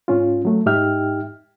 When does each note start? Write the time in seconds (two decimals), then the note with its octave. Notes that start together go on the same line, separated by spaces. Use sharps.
0.08 G#2 C#4 F4
0.45 F#3 A3
0.66 G#2 D#4 G4 E5 G5 F6